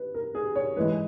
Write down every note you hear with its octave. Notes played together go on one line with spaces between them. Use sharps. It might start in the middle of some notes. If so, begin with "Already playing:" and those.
Already playing: B4
A#4
G#4
C#5
G#2 E3 G#3 B4